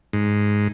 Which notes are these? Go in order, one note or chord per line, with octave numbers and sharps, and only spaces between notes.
G#2